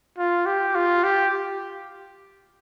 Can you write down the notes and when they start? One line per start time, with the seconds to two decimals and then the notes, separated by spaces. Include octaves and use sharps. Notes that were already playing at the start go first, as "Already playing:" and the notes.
0.18 F4
0.46 G4
0.75 F4
1.04 G4